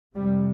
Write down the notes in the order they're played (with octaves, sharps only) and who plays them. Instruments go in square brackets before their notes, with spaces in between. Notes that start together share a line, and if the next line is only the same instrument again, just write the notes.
[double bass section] F2 C3 G3